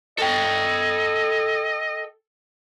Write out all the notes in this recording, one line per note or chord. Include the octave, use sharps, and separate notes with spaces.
A4 D#5 G5